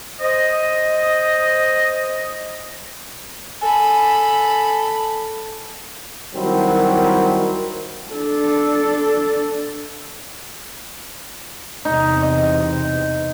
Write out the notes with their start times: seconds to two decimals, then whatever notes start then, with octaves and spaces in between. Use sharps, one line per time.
0.20 C5 D#5
3.61 A4 G#5 B5
6.35 D#3 F#3 G3 C4 E4 A#4
8.11 D4 A4
11.85 E2 C3 C4 D#4
12.22 D#5